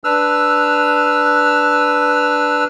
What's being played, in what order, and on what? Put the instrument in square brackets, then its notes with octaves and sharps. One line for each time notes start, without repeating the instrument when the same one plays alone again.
[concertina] D4 B4 E6 F6